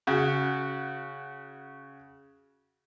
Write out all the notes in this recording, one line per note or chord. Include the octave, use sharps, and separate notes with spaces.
C#3 F#4